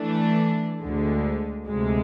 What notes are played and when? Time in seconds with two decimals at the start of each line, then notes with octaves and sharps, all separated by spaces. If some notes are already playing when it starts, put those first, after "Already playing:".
Already playing: E3 A3 D4
0.80 D2 D3 G#3
1.68 D2 C3 G#3